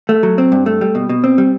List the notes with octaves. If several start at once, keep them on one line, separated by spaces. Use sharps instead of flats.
A3
F#3
C4
G2
A3
G3
B2
B2
C4
G3